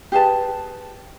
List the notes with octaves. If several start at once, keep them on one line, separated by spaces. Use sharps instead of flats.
G4 G#4 B4 A5